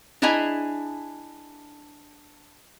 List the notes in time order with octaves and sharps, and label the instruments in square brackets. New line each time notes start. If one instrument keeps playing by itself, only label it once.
[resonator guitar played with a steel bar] D4 E4 G#4 D#5 G#5 A#5